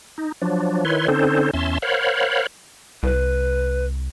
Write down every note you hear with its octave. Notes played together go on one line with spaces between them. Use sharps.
D#4
F3 F#3 D4
D#3 E4 B4 C#5 C6
D3 C4 C#4 D#4 A4 C5
E2 C#4 E5 A5 C6
A#4 C5 C#5 F5 F#5 B5
C2 B4